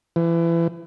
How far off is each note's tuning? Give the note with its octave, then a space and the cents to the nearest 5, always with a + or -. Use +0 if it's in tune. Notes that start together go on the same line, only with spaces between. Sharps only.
E3 +30